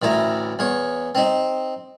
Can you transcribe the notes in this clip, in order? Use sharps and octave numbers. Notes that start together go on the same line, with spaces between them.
A1 D2 E4 A#5
E2 C#5
C4 D#4